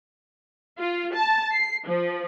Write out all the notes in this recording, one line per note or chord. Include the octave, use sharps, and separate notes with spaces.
F4
A5
C7
F3